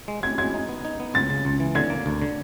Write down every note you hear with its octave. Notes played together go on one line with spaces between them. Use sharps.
G#3
G#3 G#6
G#3 G#6
D#4
B3
D#4
B3
C#2 A6
C#3
C#2
E3
D3 G#6
A#3
D2
D3